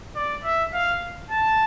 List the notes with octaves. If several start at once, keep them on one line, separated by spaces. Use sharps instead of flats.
D5
E5
F5
A5